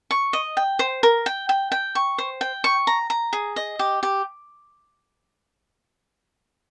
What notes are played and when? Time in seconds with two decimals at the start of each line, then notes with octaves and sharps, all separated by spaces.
0.11 C#6
0.33 D#5
0.57 G5
0.79 C5
1.03 A#4
1.26 G5
1.49 G5
1.72 G5
1.95 C#6
2.18 C5
2.41 G5
2.64 C#6
2.87 A#5
3.10 A#5
3.33 G#4
3.56 D#5
3.79 G4
4.03 G4